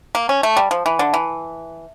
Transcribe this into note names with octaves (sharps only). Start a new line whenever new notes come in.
A#3
C#4
A3
G3
F3
E3
D3
E3